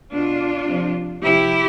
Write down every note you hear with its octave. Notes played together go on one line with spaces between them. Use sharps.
B2 D4 F4
C3 F3
C3 F3 E4 G4